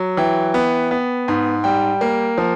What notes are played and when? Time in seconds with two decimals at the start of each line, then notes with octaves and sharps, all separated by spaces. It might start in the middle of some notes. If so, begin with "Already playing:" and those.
Already playing: F#3
0.17 E3 G5
0.54 B3
0.91 B3
1.28 G#2
1.64 G3 G5
2.01 A#3
2.38 F3